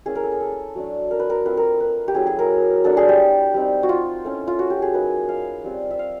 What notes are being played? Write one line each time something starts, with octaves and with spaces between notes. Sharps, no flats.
A#3 C#4 E4 G#4
A#4
A4
G#4
A4
F#3 A3 D4
A#4
B4
A#4
A3 C4 F4 B4
A#4
B4
G4
F#3 A3 C#4 E4 G#4
G#4
A#4
F#3 B3 D4 A4
G#4
G4
G3 C4 D#4
F#4
F4
A3 C#4 E4
F4
F#4
G4
G#4
F#3 A#3 D#4 B4
F5
G3 C4 F4
E5
F5